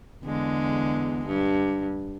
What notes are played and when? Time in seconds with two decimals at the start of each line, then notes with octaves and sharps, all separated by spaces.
0.24 E2 D3 G#3
1.27 G2